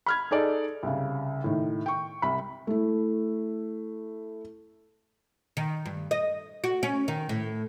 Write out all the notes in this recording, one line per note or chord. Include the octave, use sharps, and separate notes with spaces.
B5 F6 G#6
D#4 G#4 A4 D5 D#5
C2 C#3
A2 D#3
G5 C#6
C2 B5
A3 E4
D#3
G2
D#5
F#4
C#4
D#3
A2